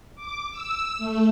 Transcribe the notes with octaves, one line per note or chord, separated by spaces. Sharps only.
D6
E6
A3